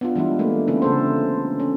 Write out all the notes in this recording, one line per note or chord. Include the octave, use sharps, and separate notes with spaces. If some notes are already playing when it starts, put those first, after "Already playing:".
B3 D4 F4
E3 G3 G#3 D4 E4
A3 A#3
D3 B3 C#4 D4 E4
C#3 A4 C5
C#4